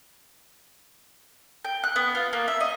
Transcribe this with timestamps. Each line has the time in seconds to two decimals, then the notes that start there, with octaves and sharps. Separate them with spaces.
1.64 G5
1.84 F#6
1.96 B3
2.15 F4
2.33 A#3
2.48 E5
2.60 D#5